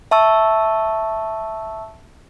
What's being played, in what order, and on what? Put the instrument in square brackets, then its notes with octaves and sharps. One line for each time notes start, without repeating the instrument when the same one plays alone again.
[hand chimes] E5 A5 C#6 E6